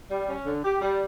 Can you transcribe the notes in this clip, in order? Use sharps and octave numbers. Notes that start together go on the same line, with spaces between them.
G3
C#4
D3
G4
G3